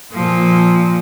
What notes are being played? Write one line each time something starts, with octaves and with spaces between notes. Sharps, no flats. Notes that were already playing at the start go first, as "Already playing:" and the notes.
A#2 F3